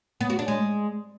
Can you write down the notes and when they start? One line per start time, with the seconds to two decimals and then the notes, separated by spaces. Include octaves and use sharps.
0.21 B3
0.30 F#4
0.39 D4
0.48 G#3